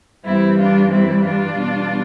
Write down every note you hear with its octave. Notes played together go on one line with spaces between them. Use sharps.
G2 E3 G3 C4 E4
D4 F4
C4 E4
D4 F4
E2 B2 G3